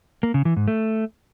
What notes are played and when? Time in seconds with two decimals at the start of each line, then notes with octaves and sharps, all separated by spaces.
0.23 A#3
0.34 C#3
0.45 E3
0.56 G#2
0.68 A3